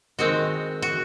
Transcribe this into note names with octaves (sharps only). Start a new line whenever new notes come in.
D#3 G#3 C4 F#4
F#4